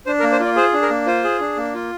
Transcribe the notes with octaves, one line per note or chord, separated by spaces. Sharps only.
D4 C5
A#4
A#3
C5
F4 D5
G#4 C5
D4
A#4
A#3
F4 C5
G#4
D4
A#3
F4